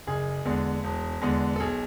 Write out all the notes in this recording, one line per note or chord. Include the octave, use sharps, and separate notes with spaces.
F#1 G#4
E2 D3 G#3
E1
E2 D3 G#3
A4
B1 G#4